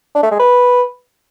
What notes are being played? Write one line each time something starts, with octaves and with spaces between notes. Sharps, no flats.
D4
A3
G#3
B4